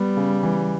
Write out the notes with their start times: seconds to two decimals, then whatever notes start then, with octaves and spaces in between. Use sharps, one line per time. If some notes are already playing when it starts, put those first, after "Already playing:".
Already playing: G3 B3
0.17 C#3
0.43 E3